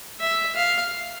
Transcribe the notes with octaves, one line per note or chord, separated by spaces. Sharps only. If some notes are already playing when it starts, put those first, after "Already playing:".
E5
F5